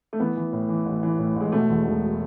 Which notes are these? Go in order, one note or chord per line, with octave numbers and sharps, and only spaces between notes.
A3
E3 B3
E3
A2
E3
A1
E3
A2
A1 G#3
B2 A3
E2
E1